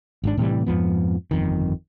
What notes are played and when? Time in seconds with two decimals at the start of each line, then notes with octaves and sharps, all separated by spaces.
0.24 G#1 G#2 D4
0.37 A2 C3 E3 G3
0.66 F2 G#2 F3 B3
1.31 G1 F2 D#3